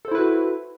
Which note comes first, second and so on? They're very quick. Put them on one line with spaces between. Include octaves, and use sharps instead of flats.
A4 C5 E4 B4 F#4